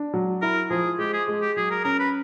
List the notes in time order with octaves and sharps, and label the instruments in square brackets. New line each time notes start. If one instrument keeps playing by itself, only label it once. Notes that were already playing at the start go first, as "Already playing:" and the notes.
Already playing: [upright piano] D4
F#3
[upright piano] E4 [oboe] A#4
[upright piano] F3 [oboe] G#4
[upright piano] G#3 [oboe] G4
[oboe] G#4
[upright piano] G#3
[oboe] G4
[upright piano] F#3 [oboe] G#4
[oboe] A#4
[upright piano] C#4 [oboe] A#4
[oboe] B4